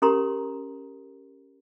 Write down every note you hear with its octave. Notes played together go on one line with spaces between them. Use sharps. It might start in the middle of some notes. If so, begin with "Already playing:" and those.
C#4 G4 A#4 A#5 C6